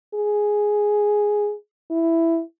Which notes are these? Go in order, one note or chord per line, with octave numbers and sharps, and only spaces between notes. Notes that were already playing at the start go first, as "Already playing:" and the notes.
G#4
E4